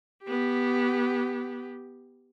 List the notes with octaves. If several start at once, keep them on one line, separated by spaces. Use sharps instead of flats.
B3 G4